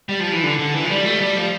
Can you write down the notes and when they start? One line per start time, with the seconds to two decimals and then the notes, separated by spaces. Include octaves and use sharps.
0.09 G3
0.20 F3
0.32 E3
0.43 D3
0.59 D3
0.75 E3
0.84 F3
0.90 G3
1.05 A3
1.21 G3
1.36 F3